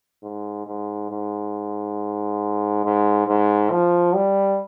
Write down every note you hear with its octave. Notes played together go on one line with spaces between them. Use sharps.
G#2
G#2
G#2
G#2
G#2
F3
G3